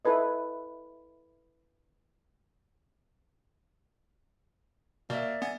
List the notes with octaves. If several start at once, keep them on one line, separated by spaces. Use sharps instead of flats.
E4 A4 B4 D#5
B2 A#3 D5 E5
B3 G#5